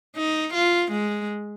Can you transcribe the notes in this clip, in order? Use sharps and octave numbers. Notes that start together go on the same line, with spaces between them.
D#4
F4
G#3